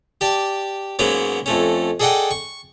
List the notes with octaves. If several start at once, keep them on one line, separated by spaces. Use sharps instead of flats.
G4 D5 A5
G#2 F#3 A#3 B3 C#4
F2 A3 C#4
G#4 A4 D5 D#5 F#5 G5
C#6